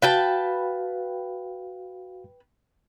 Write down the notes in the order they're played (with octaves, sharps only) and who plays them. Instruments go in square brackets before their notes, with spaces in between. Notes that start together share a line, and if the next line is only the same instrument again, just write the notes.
[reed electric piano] F#4 F5 [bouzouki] B4 G5 A5